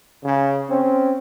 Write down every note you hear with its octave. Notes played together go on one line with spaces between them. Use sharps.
C#3
C4 C#4